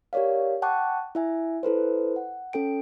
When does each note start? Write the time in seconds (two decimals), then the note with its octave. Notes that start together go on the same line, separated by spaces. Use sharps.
0.13 G4 A#4 C#5 D5 F5
0.62 F#5 G5 A5 C#6 D6 F#6
1.15 E4 E5 G#5
1.63 E4 A4 B4 C5
2.16 F#5
2.53 C#4 A4 G5 D7